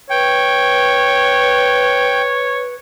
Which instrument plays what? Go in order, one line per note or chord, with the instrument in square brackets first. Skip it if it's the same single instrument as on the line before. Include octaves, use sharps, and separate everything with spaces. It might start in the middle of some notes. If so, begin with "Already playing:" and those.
[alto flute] B4 [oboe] C#5 [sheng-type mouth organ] G5